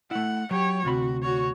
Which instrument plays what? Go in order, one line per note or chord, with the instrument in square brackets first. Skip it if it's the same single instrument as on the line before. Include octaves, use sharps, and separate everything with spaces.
[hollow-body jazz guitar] A3 E4 [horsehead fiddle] F#5
[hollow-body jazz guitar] F#3 [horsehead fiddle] G4 C#5
[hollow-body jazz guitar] D2 C3 B5 [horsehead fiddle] F#4
[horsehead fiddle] F#4 C#5